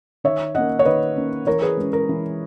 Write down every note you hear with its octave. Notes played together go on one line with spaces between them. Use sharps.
D#3 C#5 E5
A#3 C#4 D#5 F#5
C#5
D#3 B4 D#5
A#3 C#4
E3 A#4 C#5
G#4 B4
G#3 C#4
A#4
E3